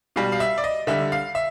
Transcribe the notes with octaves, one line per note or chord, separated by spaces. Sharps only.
B2 G3 F5
F5
E5
D5
D#5
D3 G3 E5
F5
E5